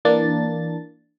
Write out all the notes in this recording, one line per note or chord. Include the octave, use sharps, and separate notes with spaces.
E3 A#3 D4 A6